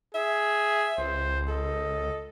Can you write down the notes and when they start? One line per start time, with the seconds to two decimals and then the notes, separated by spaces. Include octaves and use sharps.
0.15 G#4 E5
0.98 C#2 C5
1.48 A4 D#5